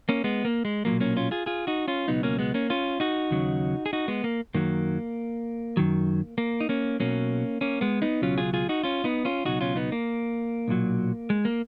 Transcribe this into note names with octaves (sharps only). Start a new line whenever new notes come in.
A#3 C#4
G#3 B3
A#3
G#3
B1 A#2 F#3 A#3
A#3 C#4
C#4 F4
F4 G#4
F4 G#4
D#4 F#4
C#4 F4
C#2 B2 F#3 B3 D#4
A#3 C#4
G#3 B3
A#3 C#4
C#4 F4
D#4 F#4
D#2 C#3 F#3
G#4
D#4 F#4
G#3 B3
A#3
F#2 D#3 F#3 A#3
F#2 D#3 F#3
A#3
D#4
A#3 C#4
B1 B2 F#3 A#3 C#4
A#3 C#4
G#3 B3
B3 D#4
C#2 B2 F#3 C#4 F4
F4 G#4
F4 G#4
D#4 F#4
C#4 F4
B3 D#4
C#4 F4
C#2 B2 F#3 D#4 F#4
C#4 F4
B3 D#4
A#3
B1 A#2 F#3
G#3
A#3